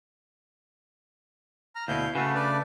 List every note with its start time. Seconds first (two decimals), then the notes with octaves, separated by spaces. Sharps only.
1.75 A#5 F6
1.88 D2 B2 E4 F5 G6
2.15 C#3 A3 F#4 B4
2.34 D4 B4 D5